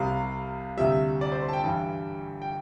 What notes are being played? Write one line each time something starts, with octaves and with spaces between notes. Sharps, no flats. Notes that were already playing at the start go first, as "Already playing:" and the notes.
Already playing: C2 C3 G3 F5
D2 C3 G3 E5
D5
C5
C5
A5
G5
G2 E3 G3
G5